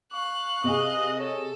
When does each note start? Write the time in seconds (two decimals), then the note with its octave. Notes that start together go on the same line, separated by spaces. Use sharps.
0.13 F5 C#6 F#6
0.64 C3 G#4 D#5 D#6
1.18 A4 C#5